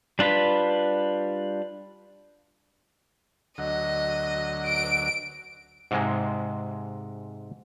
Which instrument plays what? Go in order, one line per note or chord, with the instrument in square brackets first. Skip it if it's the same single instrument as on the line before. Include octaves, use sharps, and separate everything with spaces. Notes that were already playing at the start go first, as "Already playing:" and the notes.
[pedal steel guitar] G3 D4 F4 B4 B5
[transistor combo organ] D2 F#3 [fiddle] D#5
[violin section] D7
[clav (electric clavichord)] G#2 C3 G#3